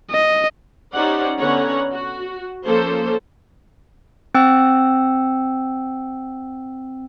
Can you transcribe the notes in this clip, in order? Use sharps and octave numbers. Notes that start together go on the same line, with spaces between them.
D#5
C#4 D#4 G4 C5 D5 F#5
D3 B3 C#4 C#5 F#5 A#5
F#4
F3 A#3 C#4 A4 C5
C4 G5 E6